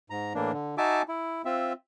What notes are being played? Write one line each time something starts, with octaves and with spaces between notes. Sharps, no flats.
G#2 A#5
A2 E3 A#3 D4
D3
D#4 F#4 E5 G#5 A5 D6
E4
C4 F4 E5